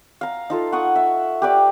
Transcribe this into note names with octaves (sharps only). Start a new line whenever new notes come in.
F5 A#5
D#4 F4 A4
F#5 C#6 D#6
E5
G4 B4 D5